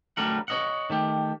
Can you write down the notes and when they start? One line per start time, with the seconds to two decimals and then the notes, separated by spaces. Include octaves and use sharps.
0.17 D3 F#3 G3 A3 A#4 F#5
0.48 C#5 D#5 F#5
0.90 D#3 A3 G4